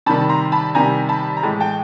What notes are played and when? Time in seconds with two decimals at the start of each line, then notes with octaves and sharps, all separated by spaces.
0.06 C3 D#3 G3 A5 B5
0.29 A#5 C6
0.52 A5 B5
0.75 C3 D#3 G3 G#5 A#5
1.09 A5 B5
1.37 A#5
1.43 A2 E3 G#3 A5 B5
1.60 G5 A5